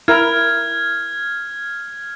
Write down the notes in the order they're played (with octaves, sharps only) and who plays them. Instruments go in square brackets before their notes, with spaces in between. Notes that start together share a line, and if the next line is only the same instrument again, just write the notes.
[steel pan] E4 A#4 [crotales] F6 G#6